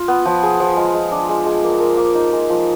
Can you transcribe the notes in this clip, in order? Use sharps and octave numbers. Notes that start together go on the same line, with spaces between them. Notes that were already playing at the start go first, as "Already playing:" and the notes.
Already playing: F4
B3
F3
G#4
F3
G#3
G#3
D4
G#3
G#3
A#3
A#4
A#3
D#4
G#3
F3